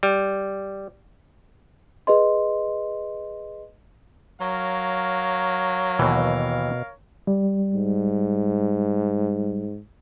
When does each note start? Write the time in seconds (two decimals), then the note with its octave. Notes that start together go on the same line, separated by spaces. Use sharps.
0.03 G3
2.07 G#4 B4 D#5 C6
4.41 F#3 A#4 C#5 F5
5.99 D#2 B2 E3
7.27 G3
7.75 G#2